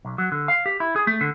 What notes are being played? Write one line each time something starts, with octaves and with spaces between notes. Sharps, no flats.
B1
F#3
D3
F5
G4
E4
G#4
A3
D3